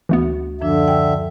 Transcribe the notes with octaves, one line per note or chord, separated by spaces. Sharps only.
D2 E3 A3 B3 F#4
F#2 D3 F3 D4 E5
G5 E6